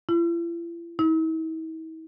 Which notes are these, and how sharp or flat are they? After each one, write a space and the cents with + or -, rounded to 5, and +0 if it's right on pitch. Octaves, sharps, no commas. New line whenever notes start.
E4 +45
E4 -45